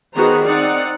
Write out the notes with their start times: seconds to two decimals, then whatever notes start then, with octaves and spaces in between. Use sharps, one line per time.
0.14 D#3 B3 F#4 G#4 C5 A#5
0.45 C4 D#4 D5 F#5